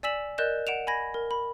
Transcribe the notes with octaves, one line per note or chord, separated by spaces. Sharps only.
D5 G#5 E6 B6 E7 F#7
A#4 D5 D#5 F#6 G6 E7
F#5 D7 E7 F7
G#5 B5 G#6 A#6
A#4
B5